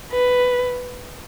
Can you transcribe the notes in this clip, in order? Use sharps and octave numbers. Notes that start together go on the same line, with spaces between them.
B4